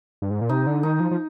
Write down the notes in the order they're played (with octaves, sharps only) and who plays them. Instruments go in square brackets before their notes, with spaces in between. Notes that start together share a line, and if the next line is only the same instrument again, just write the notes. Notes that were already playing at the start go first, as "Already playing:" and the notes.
[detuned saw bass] G2
G#2
A#2
[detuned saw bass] C3 [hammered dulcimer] D#4
[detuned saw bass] D3
[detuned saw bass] D#3 [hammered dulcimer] D#4
[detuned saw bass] F3
F3